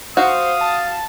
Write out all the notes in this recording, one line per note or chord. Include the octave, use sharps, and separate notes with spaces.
F#4 C5 F5 D#6
A5